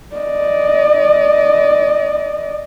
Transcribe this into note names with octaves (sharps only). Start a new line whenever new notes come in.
D5 D#5